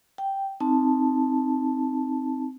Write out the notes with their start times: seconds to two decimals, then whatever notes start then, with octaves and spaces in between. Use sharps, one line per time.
0.18 G5
0.60 C4 D#4 A5